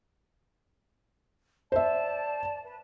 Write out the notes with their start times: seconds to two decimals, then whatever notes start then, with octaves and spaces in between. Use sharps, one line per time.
1.72 C5 D5 E5 A5
2.63 B4